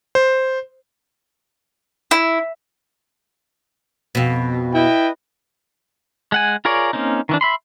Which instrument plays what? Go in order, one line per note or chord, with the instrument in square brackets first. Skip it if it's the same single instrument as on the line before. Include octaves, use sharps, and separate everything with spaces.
[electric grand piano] C5
[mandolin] E4
[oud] F2 B2
[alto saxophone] E4 [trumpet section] B4 D#5 G5
[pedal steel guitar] G#3 F#5 G#5
F4 G#4 A#4 C#5 D5
A#3 C4 C#4 D#4
D#3 E3 D4
E5 B5 C6